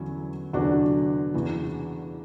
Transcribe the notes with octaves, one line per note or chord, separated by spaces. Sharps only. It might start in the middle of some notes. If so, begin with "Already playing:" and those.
Already playing: E2 D3 F#3 C#4 E4
E2 D3 F#3 D4 F#4
E2 C#3 E3